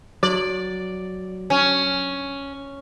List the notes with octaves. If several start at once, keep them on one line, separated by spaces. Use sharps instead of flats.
F#3 D5
C#4